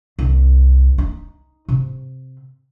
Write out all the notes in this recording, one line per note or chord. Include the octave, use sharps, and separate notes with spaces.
C2
D#4
C3